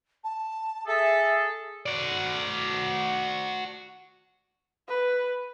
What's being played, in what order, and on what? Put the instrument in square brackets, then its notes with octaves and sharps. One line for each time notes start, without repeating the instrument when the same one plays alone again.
[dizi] A5
[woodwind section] G#4 A4 [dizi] E5
[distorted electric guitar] F#4 D5
[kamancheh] B4